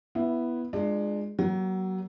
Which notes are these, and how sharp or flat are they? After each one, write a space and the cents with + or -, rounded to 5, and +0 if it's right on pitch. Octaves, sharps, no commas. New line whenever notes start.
B3 -5 E4 +10
G#3 +0 D4 +30 F4 +0
F#3 +25 A#3 +40